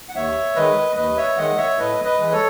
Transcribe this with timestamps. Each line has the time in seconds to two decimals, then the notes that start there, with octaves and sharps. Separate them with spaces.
0.09 F#5
0.15 D#2 C#5 E5
0.55 D#3 G#3 B4 D#5
0.96 D#2 B4 D#5
1.17 C#5 E5
1.37 D#3 G#3 D#5 F#5
1.57 C#5 E5
1.78 A2 B4 D#5
2.05 B4 D#5
2.19 E3 G#3
2.32 A4 C#5